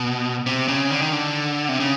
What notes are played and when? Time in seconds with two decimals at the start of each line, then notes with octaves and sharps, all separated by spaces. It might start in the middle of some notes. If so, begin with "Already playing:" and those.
Already playing: B2
0.46 C3
0.68 C#3
0.90 D3
1.01 D#3
1.13 D3
1.69 C3
1.80 C#3